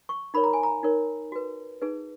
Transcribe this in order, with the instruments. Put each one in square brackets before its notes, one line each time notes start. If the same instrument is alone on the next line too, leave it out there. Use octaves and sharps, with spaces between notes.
[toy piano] C#6
D#4 A#4 C#5 B5
A#5
G#5
A#5
D#4 A#4 C#5
F#4 B4
D#4 G#4 B4